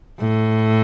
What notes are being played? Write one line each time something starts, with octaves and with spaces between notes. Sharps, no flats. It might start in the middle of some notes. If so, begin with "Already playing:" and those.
A2